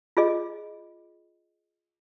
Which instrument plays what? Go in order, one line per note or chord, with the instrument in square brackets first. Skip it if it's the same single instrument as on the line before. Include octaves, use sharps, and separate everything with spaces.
[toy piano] F4 G#4 D#5